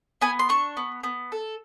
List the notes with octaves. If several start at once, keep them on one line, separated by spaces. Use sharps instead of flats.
B3 G#5
C6
D4 C#6
B3
B3
A4